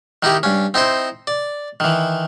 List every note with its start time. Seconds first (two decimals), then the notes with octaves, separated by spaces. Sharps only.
0.23 D#3 D#4 E4 G4
0.43 G2 C#4
0.74 C4 D#4 E4 C5
1.27 D5
1.80 D#3 E3